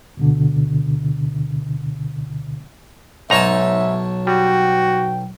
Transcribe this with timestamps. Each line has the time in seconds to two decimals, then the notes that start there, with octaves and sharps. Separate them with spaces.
0.17 D2 B2 D3
3.30 B1 G#2 D#4 C#5 E5 A5 A#5
4.27 G3 F#4 G5